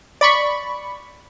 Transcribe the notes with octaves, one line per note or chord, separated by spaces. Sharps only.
D5 B5 C#6